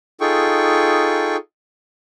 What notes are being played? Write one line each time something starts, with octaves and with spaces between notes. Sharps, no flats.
D#4 F4 G#4 A4 G5 C#6